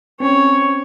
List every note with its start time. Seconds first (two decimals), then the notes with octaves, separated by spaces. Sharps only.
0.20 C4 C#4 C#5